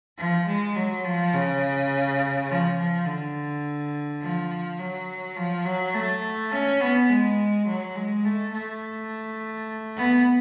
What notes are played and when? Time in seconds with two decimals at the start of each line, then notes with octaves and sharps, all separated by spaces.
0.18 F3
0.47 G#3
0.76 F#3
1.05 F3
1.33 C#3
2.49 F3
2.77 F3
3.06 D3
4.21 F3
4.78 F#3
5.36 F3
5.65 F#3
5.94 A3
6.52 C#4
6.81 B3
7.09 G#3
7.67 F#3
7.96 G#3
8.24 A3
8.53 A3
9.97 B3